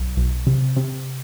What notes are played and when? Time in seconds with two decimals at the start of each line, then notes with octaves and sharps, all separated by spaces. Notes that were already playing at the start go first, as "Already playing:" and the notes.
Already playing: B1
0.17 B1
0.47 C3
0.76 C3